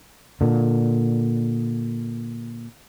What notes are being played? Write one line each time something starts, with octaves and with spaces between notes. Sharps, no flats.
A#2 D3